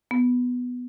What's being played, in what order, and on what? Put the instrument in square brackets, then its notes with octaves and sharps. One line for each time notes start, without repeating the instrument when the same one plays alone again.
[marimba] B3